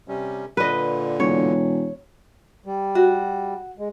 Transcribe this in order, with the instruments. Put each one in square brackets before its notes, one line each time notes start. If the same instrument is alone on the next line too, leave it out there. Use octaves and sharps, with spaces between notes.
[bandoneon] C3 G3 C#4
[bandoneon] A#2 D3 [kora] B4 D#5
[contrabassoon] E1 [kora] C#5
[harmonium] G3
[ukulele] F#4
[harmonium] G#3